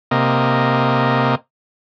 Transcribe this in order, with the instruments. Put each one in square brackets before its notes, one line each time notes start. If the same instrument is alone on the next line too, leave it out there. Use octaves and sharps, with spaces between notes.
[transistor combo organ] C3 A#3 D#5